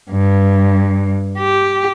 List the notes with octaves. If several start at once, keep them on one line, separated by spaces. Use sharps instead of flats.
G2
G4